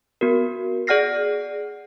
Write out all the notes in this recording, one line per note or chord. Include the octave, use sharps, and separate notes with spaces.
B3 F#4 A#4
G#4 D5 F#5 F6 A#6 C7